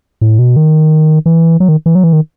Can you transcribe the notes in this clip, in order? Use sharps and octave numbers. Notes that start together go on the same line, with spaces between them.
A2
B2
D#3
E3
F#3
D#3
E3
F#3
E3
D#3